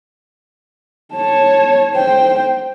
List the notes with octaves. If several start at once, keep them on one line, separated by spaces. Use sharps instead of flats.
C#5 A5
C5 G5